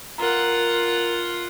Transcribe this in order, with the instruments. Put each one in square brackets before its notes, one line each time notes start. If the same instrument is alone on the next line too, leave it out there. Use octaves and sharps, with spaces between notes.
[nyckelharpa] F4 F#5 [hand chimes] A#4 A#5